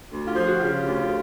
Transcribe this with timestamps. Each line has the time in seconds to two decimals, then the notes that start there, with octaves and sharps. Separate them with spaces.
0.10 D2
0.27 F4 G4
0.36 F3
0.44 F#4 G#4
0.60 C#3 F4 G4
0.85 D2